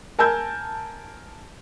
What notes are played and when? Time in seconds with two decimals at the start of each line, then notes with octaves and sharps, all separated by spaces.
0.19 A#4 G#5 A5 E6 G6